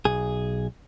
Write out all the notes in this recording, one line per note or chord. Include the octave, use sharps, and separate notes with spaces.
B1 G#4